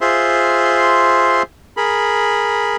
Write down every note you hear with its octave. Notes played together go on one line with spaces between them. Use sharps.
F4 G#4 C5 E5 C6
G#4 A#4 B5